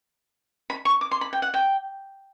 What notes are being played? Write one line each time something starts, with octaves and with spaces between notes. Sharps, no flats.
B5
C#6
D6
C6
B5
G5
F#5
G5